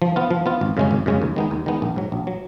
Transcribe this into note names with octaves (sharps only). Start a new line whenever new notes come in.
F3
B3 F4
F3
B3 F4
G#1
F#2 C#3 G#3 C#4
G#1
F#2 C#3 G#3 C#4
D#2
D#3 G#3 B3 D#4
D#2
D#3 G#3 B3 D#4
A#1
G#2 F#3
A#1
F#3